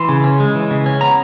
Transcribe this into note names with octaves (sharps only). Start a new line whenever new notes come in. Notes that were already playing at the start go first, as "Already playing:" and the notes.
Already playing: E3 C6
C#3
C#4
G#3
E3
C#3
C#4
B3 A#5